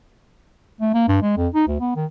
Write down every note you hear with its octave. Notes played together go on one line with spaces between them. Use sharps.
A3
A#3
G2
G#3
F2
D#4
D2
B3
D#3